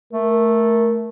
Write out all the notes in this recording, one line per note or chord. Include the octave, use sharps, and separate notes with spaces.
A3 A#4